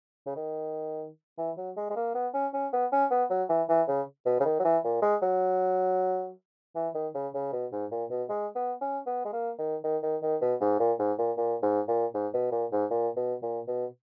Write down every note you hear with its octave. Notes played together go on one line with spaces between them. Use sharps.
C#3
D#3
E3
F#3
G#3
G#3
A#3
B3
C#4
C#4
B3
C#4
B3
F#3
E3
E3
C#3
B2
C#3
D#3
F#3
E3
A#2
G#3
F#3
E3
D#3
C#3
C#3
B2
G#2
A#2
B2
G#3
B3
C#4
B3
G#3
A#3
D#3
D#3
D#3
D#3
B2
G#2
A#2
G#2
A#2
A#2
G#2
A#2
G#2
B2
A#2
G#2
A#2
B2
A#2
B2